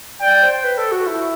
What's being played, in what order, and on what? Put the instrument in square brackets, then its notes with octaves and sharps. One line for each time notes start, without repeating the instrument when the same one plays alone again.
[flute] D5 [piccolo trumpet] G5
[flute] C5
B4
A4
F#4
E4